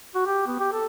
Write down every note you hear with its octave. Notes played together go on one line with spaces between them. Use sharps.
F#4
G4
B3
G4
A4